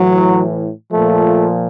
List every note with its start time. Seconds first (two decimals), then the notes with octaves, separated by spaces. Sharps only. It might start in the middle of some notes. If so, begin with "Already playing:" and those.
Already playing: A2 E3 F#3
0.92 A#2 F3 A3